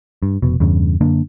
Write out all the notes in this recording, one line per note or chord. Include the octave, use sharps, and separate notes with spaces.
G2
F1 B2
E2 G2 C#3
F#2 D3 A#3 D4